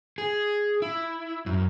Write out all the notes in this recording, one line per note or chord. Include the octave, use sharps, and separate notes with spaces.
G#4
E4
F#2